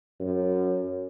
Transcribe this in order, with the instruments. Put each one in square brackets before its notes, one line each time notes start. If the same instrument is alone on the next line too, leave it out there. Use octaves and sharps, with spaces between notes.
[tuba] F#2